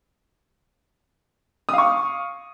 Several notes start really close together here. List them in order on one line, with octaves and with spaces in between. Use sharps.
D#6 F5 C#6